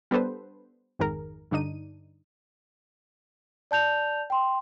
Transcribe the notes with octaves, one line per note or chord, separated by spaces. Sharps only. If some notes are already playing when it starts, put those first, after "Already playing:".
G3 B3 D4 A4 B4 C5
G#1 F2 G#2 D#3 G#4 A#4
G2 D3 D4 D#4 D#7
D5 A5 G6 F7
G5 C6